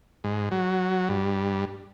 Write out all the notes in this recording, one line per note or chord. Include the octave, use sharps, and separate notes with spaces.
G#2
F#3
G2